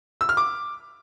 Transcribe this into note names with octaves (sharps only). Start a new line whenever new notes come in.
E6
F6
D6